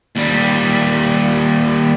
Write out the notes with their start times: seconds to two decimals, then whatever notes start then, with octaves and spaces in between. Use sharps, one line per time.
0.16 D#2 G3